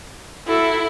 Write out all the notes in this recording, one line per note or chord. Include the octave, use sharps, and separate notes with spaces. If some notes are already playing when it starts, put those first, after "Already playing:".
E4 F#4 A4